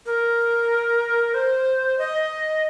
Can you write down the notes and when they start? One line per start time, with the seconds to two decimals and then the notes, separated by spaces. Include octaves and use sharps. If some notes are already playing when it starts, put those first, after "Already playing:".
0.06 A#4
1.34 C5
1.99 D#5